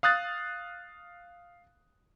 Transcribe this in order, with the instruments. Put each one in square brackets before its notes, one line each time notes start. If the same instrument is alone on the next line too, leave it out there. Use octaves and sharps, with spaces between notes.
[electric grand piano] F5 D#6 F#6 A6